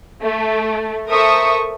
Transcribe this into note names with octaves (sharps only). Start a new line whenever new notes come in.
A3
A4 A#4 C5 E5 C#6 D#6